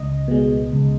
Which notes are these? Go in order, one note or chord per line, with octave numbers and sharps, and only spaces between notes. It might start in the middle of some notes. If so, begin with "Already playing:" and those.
Already playing: C#2 D#5
B2 G#3
C#2